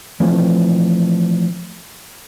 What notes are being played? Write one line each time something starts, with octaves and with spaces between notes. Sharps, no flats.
E3 F3 A3 C4